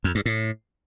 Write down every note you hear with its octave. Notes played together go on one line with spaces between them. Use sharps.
F2
G2
A2